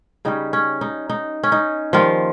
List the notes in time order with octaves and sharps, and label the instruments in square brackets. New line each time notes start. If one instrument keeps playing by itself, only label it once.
[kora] C#3 G3 C#4 D#4
C#4
D#4
D#4
C#4
D#4
D#3 F3 G3 A#3 F4